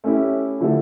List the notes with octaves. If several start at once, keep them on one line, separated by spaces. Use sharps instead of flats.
A3 C#4 E4 G4
D3 F3 A3 E4 A4